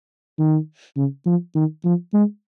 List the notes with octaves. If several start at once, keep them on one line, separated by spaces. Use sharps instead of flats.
D#3
C#3
F3
D#3
F3
G#3